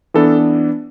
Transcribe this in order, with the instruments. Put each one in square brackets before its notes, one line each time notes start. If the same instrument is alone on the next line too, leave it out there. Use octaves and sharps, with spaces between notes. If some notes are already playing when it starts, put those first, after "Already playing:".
[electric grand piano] E3 B3 D4 A4